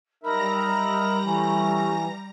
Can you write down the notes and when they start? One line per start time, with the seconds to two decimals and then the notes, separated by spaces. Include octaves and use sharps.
0.23 G3 D#4 A#4 E5 A#5 B5 A#6
1.24 E3 A3 C#4